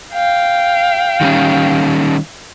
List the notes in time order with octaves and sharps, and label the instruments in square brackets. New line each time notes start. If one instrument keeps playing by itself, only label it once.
[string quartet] F5 G5
[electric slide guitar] D#3 G3 C#4